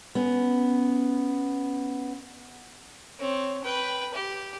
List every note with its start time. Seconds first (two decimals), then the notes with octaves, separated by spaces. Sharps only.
0.15 B3 C#4
3.19 C4 C#5
3.64 B4 G5
4.14 G4